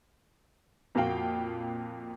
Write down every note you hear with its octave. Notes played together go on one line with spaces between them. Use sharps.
F2 A#2 F#4 F5 G5